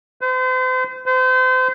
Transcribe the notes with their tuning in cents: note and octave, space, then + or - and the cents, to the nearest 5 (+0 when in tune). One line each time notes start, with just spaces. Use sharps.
C5 -40
C5 -35